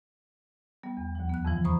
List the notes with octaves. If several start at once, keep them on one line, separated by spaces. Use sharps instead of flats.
G3 B3
E2
D#2 F3
B3 F#6
F2 G#2 C#3 E3 F3 G3
C5 A#5 B5 C#6 D#6